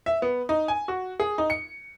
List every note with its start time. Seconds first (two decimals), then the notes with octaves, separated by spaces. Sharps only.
0.06 E5
0.22 B3
0.49 D#4
0.68 G#5
0.88 F#4
1.20 G#4
1.38 D#4
1.50 C#7